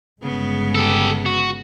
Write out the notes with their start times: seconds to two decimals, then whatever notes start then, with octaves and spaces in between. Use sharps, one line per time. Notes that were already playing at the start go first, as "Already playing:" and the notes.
0.23 G1 C#3 G#3 B3
0.75 G4 A4
1.26 F#4